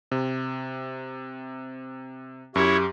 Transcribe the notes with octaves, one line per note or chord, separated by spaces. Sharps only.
C3
F#2 E4 G4 C#5